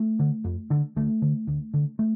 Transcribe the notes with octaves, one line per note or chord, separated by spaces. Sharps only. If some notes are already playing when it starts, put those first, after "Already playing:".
Already playing: A3
D3
F2
D3
D2 A3
D3
D2
D3
A3